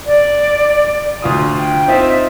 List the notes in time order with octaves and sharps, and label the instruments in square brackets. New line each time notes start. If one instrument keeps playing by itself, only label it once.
[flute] D5
[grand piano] D2 F4 D#6
[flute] G5
[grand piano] C4 D#4 F4 [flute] E5